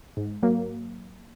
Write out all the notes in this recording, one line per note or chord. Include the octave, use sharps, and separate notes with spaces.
G#2
F#3 A#3